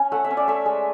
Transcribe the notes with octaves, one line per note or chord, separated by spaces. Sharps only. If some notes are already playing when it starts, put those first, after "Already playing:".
Already playing: C#4
A3 F#5
E5
C#4
D5
A3 E5
G#3